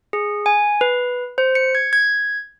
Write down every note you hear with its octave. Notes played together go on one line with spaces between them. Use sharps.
G#4
G#5
B4
C5
C#7
G#6
G#6